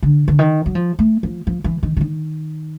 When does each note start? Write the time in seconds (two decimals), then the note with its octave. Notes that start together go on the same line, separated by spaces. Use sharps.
0.03 D3
0.28 D3
0.39 D#3
0.66 F#3
0.75 F3
0.99 A3
1.23 F3
1.47 F3
1.64 E3
1.83 D#3
1.97 D3
2.01 D#3